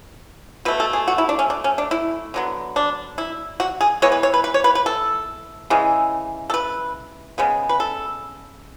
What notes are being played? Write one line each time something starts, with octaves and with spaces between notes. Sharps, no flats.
B2 A3 B4
A4
G#4
F#4
E4
D4
C#4
D4
C#4
D4
E4
D3 F#3 B3
D4
E4
F#4
G#4
E3 G#3 B3 C#5
B4
C#5
B4
B4
C#5
B4
B4
A4
C#3 E3 G#3
A4
B4
C#3 G#3 B3
B4
A4